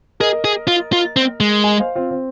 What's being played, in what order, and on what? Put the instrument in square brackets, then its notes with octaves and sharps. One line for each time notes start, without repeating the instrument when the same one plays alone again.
[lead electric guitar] G#4 [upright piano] A#4 D#5
[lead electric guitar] G#4
F4
F4
C4
G#3
[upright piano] D#5 G#5
C5 F5
C4 F4
C4